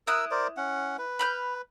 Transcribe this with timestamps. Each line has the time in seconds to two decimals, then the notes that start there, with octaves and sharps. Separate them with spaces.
0.07 E4 A#4 D#6 E6 F#6
0.31 A#4 C5 D5
0.57 C#4 F#5
0.98 B4
1.19 B5 F6 G6